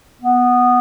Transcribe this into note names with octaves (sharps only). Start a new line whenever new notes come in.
B3